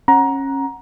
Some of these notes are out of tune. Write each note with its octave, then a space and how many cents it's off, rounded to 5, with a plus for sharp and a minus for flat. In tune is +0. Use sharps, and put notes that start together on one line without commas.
C#4 -25 F#5 +0 A#5 +20